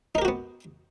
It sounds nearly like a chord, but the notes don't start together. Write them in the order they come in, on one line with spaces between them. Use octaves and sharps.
D#4 A#4 G4 F#4 B3